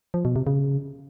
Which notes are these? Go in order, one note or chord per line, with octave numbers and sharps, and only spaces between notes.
F3
B2
C3
C#3